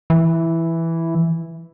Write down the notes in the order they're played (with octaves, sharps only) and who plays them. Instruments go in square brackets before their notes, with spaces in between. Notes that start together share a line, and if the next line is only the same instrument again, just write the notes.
[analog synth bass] E3